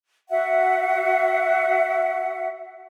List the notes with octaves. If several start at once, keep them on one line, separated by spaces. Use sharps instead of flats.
F#4 E5 F#5